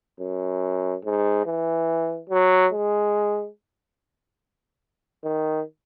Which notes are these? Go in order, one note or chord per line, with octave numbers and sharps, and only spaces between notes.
F#2
G#2
E3
F#3
G#3
D#3